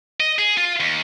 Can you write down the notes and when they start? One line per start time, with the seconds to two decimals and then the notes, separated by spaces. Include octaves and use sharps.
0.20 D#5
0.39 G#4
0.57 F4
0.80 D#2